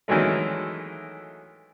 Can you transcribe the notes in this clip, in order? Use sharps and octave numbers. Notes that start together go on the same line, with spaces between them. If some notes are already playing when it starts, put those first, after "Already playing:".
D#3 E3 F#3 G#3 A3